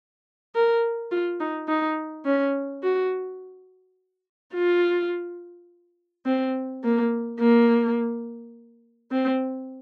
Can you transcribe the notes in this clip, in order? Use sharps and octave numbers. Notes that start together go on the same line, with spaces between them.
A#4
F4
D#4
D#4
C#4
F#4
F4
C4
A#3
A#3
C4